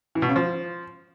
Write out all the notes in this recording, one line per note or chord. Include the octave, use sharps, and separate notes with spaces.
E3
B2
C#3
F3